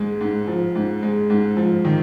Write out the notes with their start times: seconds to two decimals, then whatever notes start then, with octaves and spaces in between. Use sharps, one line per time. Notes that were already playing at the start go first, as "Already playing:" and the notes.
Already playing: G#2 G#3
0.21 G#2
0.47 F3
0.75 G#2
1.02 G#3
1.30 G#2
1.57 F3
1.85 D#3